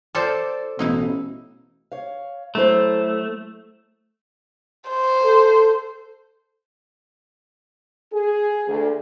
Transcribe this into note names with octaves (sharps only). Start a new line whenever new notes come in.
C4 F4 A4 C5 D5
A1 B2 A#3 D#4 E4
C#5 F5
F#3 A3 E4 C5
C5
A4
G#4
D2